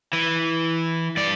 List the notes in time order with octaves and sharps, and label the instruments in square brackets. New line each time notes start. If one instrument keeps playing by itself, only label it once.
[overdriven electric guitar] E3
G2 D5